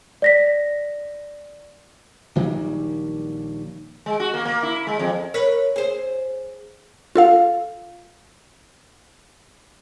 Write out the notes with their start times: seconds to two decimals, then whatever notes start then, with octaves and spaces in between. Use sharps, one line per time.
0.22 D5 A#6 B6
2.36 A#1 D#3 F#3 G3
4.06 G#3
4.20 F#4
4.34 A#3
4.45 A#3
4.63 E4
4.87 G#3
4.99 F2
5.34 A#4 B4 C#5
5.76 G#4 C5
7.15 F4 A4 F5